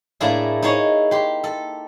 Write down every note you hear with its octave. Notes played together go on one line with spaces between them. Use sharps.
A2 A3 A#3 D4 E4 G#4
D#4 E4 G#4 C#5
G4 C6
A4